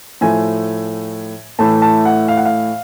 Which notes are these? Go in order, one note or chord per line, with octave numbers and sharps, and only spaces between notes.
A2 F3 A3 G#5
A2 E3 A3 A5
A5
F#5
F5
F#5
F5